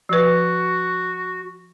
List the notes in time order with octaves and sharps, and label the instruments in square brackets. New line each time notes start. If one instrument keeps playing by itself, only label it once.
[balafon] F3 B4 [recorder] F#4